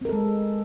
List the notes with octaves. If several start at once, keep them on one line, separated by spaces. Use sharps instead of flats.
G#3 C4 A4 A#4